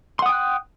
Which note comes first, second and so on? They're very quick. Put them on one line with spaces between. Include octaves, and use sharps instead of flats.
C6 F#5 D#6 G5 F#6